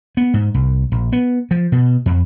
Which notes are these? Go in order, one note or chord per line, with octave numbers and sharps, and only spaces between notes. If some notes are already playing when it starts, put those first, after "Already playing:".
B3
G#2
C2
A#1
B3
F3
B2
F2